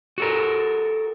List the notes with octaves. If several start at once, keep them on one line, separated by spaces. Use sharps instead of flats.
F#4 A4 A#4